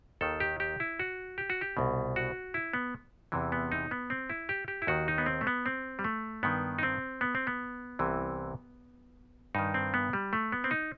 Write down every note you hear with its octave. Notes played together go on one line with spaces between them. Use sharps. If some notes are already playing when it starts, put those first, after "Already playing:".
D#2 D#3 A4
G4
G4
E4
F#4
G4
F#4
G4
C2 B2
F#4
E4
B3
E2 C3 E3
B3
D#4
B3
C4
E4
G4
G4
E4
D#2 D#3 F#4
D#4
B3
C4
A3
B3
C4
G3
A3
G2 D#3 B3
D#4
C4
B3
C4
B3
C2 C3 E3
G2 D#3 D#4
C4
B3
G3
A3
B3
C4
D#4